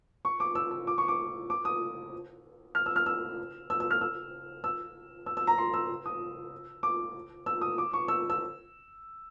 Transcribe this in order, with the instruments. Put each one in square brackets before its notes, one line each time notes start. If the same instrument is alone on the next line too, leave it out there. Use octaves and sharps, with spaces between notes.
[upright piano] C#6
D6
E6
E6
D6
C#6
D6
D6
D#6
F6
E6
F6
E6
E6
E6
F6
E6
E6
E6
E6
A#5
C6
E6
D#6
D6
E6
D#6
D6
C#6
E6
E6